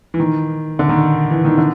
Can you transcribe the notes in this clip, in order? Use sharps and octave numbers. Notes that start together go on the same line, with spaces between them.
E3
D#3
D3
D#3
E3
D#3
D3